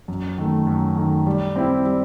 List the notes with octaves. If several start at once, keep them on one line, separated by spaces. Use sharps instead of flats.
F#2
D#3 A3
F#2
D#3 A3
G3
C4 E4 G4
G3